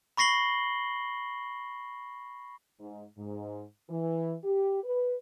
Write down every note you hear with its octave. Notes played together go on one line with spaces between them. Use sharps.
B5 C#6 A#6 C7 F#7 G7
G#2
G#2
E3
G4
B4